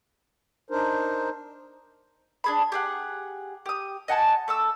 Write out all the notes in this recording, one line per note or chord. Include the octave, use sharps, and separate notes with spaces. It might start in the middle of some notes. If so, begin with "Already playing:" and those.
D4 D#4 A#4 C5
D4 G#4 B5
G4 G#4 F#5
G4 D#6
D#5 F#5 G#5 A5
A3 D6 E6